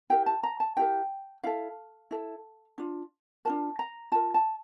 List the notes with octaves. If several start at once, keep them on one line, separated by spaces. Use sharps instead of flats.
E4 G4 A#4 G5
A5
A#5
A5
E4 G4 A#4 G5
E4 A4 F5
E4 A4
D4 F4
D4 F4 A#4 A5
A#5
F4 A#4 A5
A5